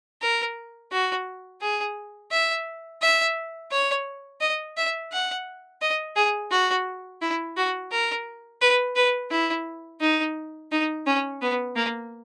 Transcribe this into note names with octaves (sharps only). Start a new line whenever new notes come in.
A#4
F#4
G#4
E5
E5
C#5
D#5
E5
F#5
D#5
G#4
F#4
E4
F#4
A#4
B4
B4
E4
D#4
D#4
C#4
B3
A#3